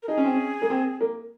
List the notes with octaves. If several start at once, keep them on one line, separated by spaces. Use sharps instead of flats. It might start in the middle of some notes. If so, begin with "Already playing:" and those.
A#4
D#4 G#4
C#4
C4
C#4
A#3
C4
A#3